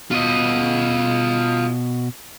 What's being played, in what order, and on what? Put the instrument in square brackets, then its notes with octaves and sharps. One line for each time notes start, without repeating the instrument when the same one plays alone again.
[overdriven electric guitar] B2 [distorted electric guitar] F4 D#5